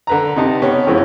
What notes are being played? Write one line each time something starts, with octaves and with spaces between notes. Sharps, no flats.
D3 B4 A#5
C3 D#4 A5
B3 C#4 G4
F#2 E3 G#3 C#4 F4